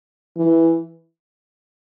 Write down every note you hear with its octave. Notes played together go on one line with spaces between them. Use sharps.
E3